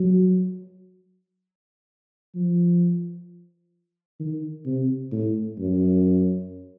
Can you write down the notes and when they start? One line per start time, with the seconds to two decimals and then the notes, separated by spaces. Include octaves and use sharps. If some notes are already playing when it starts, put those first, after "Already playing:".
Already playing: F#3
2.35 F3
4.20 D#3
4.66 C3
5.12 A2
5.58 F#2